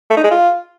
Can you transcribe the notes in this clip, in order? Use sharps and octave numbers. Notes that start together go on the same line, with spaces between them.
A3
D#4
G#3
F4